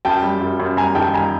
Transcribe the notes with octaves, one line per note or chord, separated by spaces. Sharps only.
F#2 G5 A5
G3
F#2
F#2
G3 G#5 A#5
D#3 G5 A5
G3 G#5 A#5